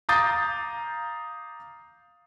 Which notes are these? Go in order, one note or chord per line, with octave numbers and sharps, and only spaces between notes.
F5 A#5 D6 D#6 G6 A6